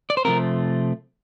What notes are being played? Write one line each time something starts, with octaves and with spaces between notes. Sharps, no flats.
D5
C5
C3 F3 A3 C4 A#4